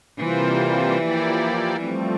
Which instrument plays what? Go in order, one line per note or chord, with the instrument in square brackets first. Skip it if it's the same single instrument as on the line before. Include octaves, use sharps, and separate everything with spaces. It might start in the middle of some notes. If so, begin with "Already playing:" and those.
[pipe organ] C3 G3 A#3 F4 C5 [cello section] E3
[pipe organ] F3 A#3 E4 G4 D5
[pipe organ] F3 A3 C4 [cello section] G3